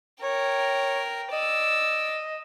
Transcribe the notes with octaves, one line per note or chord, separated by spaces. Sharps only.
A#4 C#5 G5
D5 D#5 E6